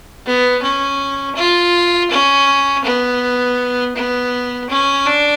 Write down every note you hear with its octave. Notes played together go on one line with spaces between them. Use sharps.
B3
C#4
F4
C#4
B3
B3
C#4
D4